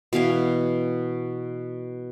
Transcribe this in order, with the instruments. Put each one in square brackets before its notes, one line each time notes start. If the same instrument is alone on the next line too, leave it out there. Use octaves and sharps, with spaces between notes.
[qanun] B2 E3 F5 G#5